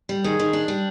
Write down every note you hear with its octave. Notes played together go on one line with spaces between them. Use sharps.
G3
D#3 G#4
D#3
D4
G3